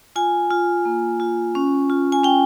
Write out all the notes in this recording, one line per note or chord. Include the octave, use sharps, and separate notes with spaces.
F4 G#5
F4
A#3
F4
C#4
F4
G#5
C#4 G5